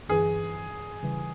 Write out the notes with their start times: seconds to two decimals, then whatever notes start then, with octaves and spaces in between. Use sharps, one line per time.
0.09 G1 G2 E3 G#4
1.03 C#3 E3 G3